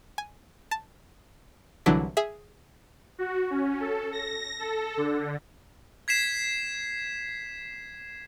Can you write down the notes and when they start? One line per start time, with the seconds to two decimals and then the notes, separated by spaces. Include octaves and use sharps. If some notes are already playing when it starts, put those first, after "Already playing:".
0.18 G#5
0.71 A5
1.86 C2 D3 E3 F#3 D4 B6
2.17 G#4 E5
3.19 F#4
3.50 C#4
3.80 A4
4.12 A#6
4.59 A4
4.97 D3
6.08 G#6 B6 C7 E7